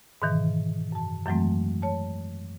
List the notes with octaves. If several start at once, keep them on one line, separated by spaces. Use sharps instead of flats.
G#2 B2 D#3 E3
F#2 A5
F#2 E3 F#3 G#3 A3 C4
C#5 A5